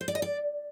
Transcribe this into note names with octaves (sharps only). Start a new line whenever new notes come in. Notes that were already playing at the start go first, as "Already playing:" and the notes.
C5
D5
D#5
D5